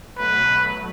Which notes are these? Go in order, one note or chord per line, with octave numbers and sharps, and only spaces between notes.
B2 F#3 A3 B4